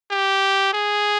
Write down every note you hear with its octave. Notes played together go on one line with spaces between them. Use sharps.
G4
G#4